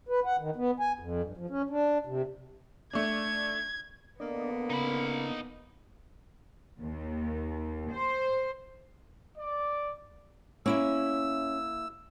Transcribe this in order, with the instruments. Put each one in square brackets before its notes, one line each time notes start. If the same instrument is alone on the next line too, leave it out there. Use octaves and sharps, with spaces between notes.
[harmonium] B4
F#5
D#3
B3
G#5
F2
G2
F3
C#4
D4
C3
[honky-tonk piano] A3 D4 [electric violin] G#6
[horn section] D3 A#3 [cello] B3 [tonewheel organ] D4 D5 D#5
[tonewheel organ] C#3 [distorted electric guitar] D#4 B5
[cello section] D#2
C5
[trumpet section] D5
[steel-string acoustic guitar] A#3 E4 E5 [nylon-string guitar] C#4 [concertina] E6